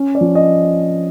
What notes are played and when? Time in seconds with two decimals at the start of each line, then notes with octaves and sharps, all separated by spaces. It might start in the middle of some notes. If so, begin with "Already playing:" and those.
Already playing: C#4
0.15 D5
0.21 F3
0.35 D#5